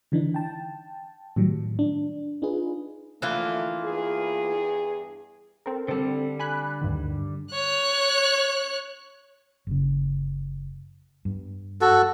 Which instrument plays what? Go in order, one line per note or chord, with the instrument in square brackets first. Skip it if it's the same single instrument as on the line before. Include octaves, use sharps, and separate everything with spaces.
[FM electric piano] D3 E3 D4 D#4
G5 A5
A2 D#3 F#3 G3
D4
D4 D#4 F4 G#4 B4
[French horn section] D3 F3 A3 [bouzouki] E3 A#3 F4
[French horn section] E2 G2 G#4
[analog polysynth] C4 A4 A#4
[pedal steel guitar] D3 G3 [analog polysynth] C4 A4
[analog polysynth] G#5 B5 F#6
D2 G2 D#3
[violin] C#5 F#6
[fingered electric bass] F#1 C#3
G2 B3
[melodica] F#4 A4